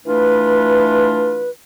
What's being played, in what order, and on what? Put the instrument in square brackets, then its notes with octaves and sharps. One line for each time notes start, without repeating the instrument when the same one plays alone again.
[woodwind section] E3 A3 D4 F4 B4